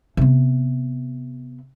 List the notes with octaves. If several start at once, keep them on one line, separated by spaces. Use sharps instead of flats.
C3 B3